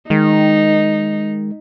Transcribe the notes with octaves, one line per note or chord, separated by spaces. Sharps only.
D#3 G#3 D#4